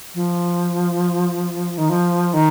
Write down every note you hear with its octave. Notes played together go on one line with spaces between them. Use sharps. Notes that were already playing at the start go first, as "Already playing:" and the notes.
F3
D#3
F3
D#3